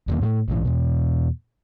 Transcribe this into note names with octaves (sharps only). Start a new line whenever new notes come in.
E1 D#2 A#3
A2 G3 A3
A#1 G#2 E3
E2 B2